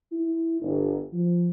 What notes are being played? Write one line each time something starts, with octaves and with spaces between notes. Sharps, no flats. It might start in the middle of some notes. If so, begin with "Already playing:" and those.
E4
G1
F3